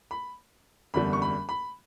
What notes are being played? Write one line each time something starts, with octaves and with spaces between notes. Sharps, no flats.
B5
F#1 E2 D3 G3 B5
C#6
B5
B5